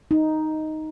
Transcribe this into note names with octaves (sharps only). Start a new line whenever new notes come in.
D#4